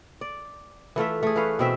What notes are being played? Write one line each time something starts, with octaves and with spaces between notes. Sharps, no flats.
D5
E3 A3 F4 E5
A3 G#4
E3 C#4 B4 F5
B2 C4 E5